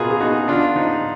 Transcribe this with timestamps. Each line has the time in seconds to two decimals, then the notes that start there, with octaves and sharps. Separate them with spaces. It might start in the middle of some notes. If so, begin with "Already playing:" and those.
Already playing: B2 B3 F4 F#4 G#4 A#4
0.11 G#4
0.20 B3 D#4 F#4
0.48 D3 D4 F4
0.76 F3 D#4